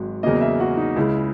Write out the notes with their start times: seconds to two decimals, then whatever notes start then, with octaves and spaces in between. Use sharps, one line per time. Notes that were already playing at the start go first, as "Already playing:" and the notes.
Already playing: G#1 G#2 F#3
0.23 E2 C#3 F#3 A#3 D#5
0.41 E5
0.60 F#4
0.77 D#4
0.96 C#2 C#3 G#3 E4